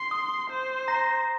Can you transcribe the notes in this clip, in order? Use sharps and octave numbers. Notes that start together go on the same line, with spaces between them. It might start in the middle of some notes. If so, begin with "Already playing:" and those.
Already playing: C6
D#6
C5
A#5 A#6